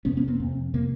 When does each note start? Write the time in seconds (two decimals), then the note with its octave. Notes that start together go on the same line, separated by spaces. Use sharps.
0.05 F2 C3 B3 C#4
0.17 B3 C#4
0.28 A#3 C4
0.40 F2 C3
0.74 C3 A#3 C4